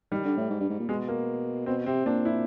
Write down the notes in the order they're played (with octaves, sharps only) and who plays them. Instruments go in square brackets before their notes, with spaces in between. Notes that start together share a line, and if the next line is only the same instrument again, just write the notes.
[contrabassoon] D#3 [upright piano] G3
[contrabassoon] D3
A2
G#2
G2
G#2
A#2
[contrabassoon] B2 [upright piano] G#3
[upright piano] A#3
[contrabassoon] B2 [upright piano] C4
[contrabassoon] C3 [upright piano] C4
[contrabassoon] A#2 [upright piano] D4
[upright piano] E4